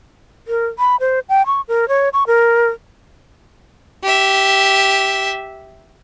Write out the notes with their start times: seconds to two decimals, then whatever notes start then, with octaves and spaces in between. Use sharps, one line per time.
0.47 A#4
0.79 B5
1.00 C5
1.29 G5
1.46 C#6
1.68 A#4
1.88 C#5
2.13 C#6
2.27 A#4
4.03 G4 E5